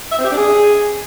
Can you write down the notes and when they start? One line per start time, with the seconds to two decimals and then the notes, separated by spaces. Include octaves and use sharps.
0.12 E5
0.19 C4
0.25 G4
0.31 D4
0.38 G#4